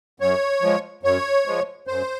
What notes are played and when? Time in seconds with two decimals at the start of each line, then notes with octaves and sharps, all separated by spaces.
0.20 F#2 C#5
0.62 F3 G#3
1.03 F#2 C#5
1.46 F3 G#3
1.87 F#2 C5